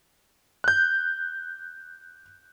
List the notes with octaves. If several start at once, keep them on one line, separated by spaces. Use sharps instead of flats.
F#6 G6